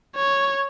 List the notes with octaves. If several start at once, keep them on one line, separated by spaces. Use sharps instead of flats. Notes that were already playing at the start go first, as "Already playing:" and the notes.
C#5